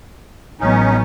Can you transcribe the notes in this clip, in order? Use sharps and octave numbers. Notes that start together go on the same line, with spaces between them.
A1 F#3 B3 C#4 D#4